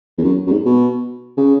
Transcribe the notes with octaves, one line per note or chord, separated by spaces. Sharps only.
E2
F#2
F#2
G#2
B2
C#3